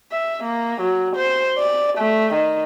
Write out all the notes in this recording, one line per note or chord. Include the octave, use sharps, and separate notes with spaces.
E5
A#3
F#3
C5
D5
A3
D#3